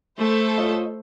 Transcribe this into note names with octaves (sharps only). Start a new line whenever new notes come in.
A3 E4 A4 C5
F4 C#5 D#5